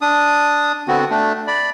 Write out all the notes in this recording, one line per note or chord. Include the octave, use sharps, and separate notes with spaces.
D4 D#6
D3 B3 C4 F#4
A3 D4
D5 B5